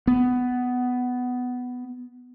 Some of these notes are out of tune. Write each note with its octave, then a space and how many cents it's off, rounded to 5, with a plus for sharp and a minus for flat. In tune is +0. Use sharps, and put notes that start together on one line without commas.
B3 +10